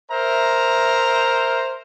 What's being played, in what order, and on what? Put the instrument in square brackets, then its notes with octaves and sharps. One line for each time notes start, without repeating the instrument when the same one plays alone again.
[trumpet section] A#4 C5 E5 A#5